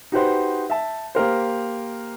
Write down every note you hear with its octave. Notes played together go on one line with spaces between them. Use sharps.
D#4 F#4 G4 B4 C5 F#5
E5 A5
A#3 G4 A#4 C5